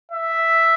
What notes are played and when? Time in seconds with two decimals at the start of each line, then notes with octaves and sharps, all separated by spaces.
0.12 E5